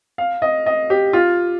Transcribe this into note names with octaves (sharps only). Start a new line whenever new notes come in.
F5
D#5
D#5
G4
F4